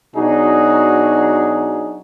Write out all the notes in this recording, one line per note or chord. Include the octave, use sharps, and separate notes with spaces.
B2 F#3 D4 D#4 F#4 G#4